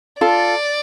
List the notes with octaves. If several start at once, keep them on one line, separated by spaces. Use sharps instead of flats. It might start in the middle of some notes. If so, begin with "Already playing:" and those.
F4 A4 D5